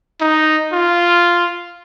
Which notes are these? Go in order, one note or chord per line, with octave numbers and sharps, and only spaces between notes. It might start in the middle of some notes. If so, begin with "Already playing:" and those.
D#4
F4